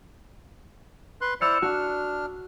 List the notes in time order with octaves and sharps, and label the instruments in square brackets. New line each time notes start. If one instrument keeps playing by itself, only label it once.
[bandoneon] B4 C6 F#6
[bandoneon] E4 C5 D5 [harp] E6 F6 C#7
[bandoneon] D4 F6 [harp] F#4